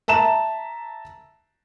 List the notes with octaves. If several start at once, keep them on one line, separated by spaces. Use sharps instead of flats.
E5 A5 A#5 E7